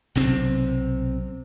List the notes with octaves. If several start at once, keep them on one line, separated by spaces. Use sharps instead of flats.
B1 C3 C4